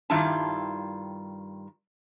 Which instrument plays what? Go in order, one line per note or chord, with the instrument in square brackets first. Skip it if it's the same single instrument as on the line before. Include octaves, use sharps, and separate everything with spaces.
[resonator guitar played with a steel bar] G2 D#3 G3 E4 F4 A5